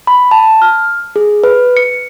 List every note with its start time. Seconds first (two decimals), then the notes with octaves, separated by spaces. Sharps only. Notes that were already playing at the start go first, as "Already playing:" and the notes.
0.07 B5
0.31 A5
0.62 F6
1.16 G#4
1.44 B4
1.77 C#7